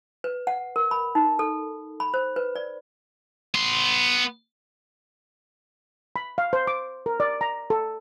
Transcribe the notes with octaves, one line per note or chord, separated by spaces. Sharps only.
B4
F#5
A#4
B5
D#4
A4
B5
C5
B4
D5
B3 C6
B5
F5
C5
D6
A#4
D5
A#5
A4